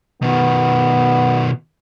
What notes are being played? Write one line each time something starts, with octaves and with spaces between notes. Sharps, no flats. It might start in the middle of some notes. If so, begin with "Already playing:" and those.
B2 D#3 B3